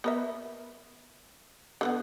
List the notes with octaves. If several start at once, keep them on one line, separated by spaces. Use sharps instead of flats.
B3 A#4 E5
D3 A#3 B3